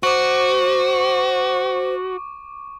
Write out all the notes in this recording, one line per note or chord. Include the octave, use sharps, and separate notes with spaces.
F#4 C5 C#6 D6